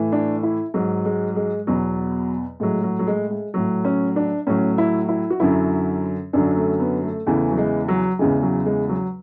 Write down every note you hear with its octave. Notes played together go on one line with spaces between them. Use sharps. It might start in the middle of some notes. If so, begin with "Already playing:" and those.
Already playing: A2 E3
D4
E4
G#2 F#3
G#3
G#3
E2 B2 F#3
A2 F#3 G#3
F#3
F#3
G#3
G#3
A2 F#3
C#4
D4
A2 F#3 C#4
E4
E4
F#4
F#2 D3 F#3 E4
F#2 D3 F#3 D4
A3
B3
A3
E2 C#3 E3 A3
F#3
G#3
F#3
E2 C#3 E3 G#3
F#3
G#3
F#3